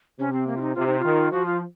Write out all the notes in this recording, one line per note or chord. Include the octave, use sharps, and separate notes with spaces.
C3 C#4
C4
A#3
F4
D#4
C3 F4
D#4
D#3 F4
F3 F#4
F4